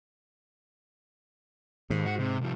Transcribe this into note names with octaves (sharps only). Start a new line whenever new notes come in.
D#2 G#2
F#4
C3
C2 F3